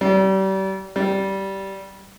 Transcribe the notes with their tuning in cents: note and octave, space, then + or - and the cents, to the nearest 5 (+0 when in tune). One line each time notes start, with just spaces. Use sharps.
G3 -35
G3 -15